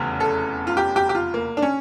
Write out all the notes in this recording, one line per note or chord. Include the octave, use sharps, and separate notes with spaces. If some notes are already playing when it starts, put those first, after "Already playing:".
Already playing: F1 E2 C#3 E3
A4
F4
G4
G4
G4
F4
A#3
D4
C#4